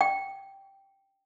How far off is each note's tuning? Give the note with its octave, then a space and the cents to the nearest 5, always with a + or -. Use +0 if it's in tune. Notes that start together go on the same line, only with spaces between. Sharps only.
G5 -5